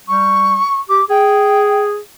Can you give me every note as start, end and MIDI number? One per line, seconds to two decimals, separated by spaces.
0.08 0.59 55
0.08 0.79 85
0.89 1.01 67
0.89 1.04 86
1.09 1.98 68
1.09 1.84 79